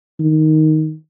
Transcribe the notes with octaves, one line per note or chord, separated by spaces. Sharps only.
D#3